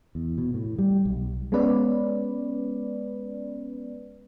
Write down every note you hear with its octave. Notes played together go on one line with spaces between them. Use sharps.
E2
B2
A2
G3
B1
G#3 B3 C#4 B4 D5